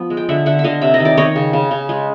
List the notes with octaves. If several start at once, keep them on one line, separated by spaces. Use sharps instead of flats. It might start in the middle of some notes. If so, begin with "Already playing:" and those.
Already playing: F3 B3
G#3
G5
D3 E5 F#5
D3 E5 F#5
E5
D3 D#5 F5
C3 E5
D#5
D#3
D5
D#3 C#5 D#5
C#3
C#3
C#3
G#3